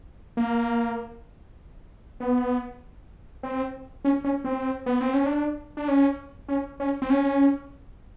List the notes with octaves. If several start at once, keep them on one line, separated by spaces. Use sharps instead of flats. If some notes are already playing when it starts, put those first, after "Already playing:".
A#3
B3
C4
C#4
C#4
C4
B3
C4
C#4
D4
D4
C#4
C#4
C#4
C4
C#4